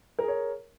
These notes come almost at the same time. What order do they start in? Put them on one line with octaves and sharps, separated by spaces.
A#4 G#4 C#5